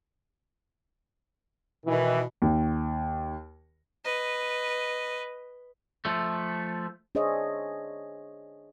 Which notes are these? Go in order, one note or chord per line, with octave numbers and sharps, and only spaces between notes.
B2 D#3 E3
D#2
B4 D#5
F3 A3
D4 G#4 C5 C#5 D#5 E5